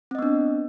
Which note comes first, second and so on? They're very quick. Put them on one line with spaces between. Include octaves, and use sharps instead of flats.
C4 D#5 B3 D4